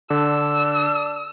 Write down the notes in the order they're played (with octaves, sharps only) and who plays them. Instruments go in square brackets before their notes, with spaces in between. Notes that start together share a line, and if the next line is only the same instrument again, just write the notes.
[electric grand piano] D3 [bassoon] D4 [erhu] E6